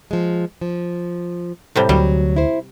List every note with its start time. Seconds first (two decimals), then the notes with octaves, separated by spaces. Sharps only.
0.11 F3 G#3
0.61 F3
1.76 A2 C3 G3
1.89 D2 F#3 G3
2.36 E4 C5